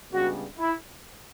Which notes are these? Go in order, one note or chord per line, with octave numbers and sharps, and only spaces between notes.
C#2 C#3 G3 B3 D4 F#4
E4